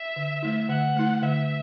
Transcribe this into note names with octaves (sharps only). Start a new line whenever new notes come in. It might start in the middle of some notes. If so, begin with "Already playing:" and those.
Already playing: E5
D3
A3 E4
D3 F#5
A3 E4
D3 E5